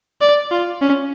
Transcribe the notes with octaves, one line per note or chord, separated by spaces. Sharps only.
D5
F4
C#4